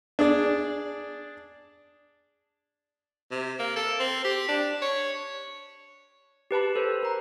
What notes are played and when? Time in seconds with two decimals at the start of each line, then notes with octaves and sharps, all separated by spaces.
0.19 D4 G#4 D5
3.31 C3
3.59 A#3
3.76 A4
3.99 C4
4.24 G4
4.49 D4
4.82 C#5
6.51 G4 B4 A5 B5
6.76 A4 C5
7.03 A#4 A#5